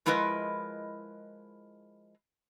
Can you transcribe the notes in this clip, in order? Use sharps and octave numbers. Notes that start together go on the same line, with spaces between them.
F3 G#3 E4 A#4 B4 D#5